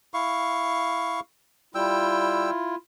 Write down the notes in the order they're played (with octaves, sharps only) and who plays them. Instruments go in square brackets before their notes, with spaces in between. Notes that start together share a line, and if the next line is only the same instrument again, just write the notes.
[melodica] E4 F5 C#6
[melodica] G3 G5 E6 [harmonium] E4 F4